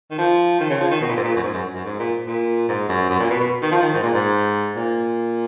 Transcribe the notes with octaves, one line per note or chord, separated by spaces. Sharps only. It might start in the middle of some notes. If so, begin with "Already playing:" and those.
D#3
F3
D#3
C#3
F3
D#3
B2
A#2
G#2
A#2
F#2
G#2
F#2
F#2
G#2
A#2
A#2
G#2
F#2
F#2
A#2
B2
B2
D#3
F3
D#3
G#2
A#2
G#2
A#2